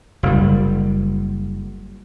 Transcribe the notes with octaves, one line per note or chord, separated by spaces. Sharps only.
F#1 G3